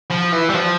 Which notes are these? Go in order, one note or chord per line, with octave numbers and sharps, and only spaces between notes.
F3
E3
G3
F3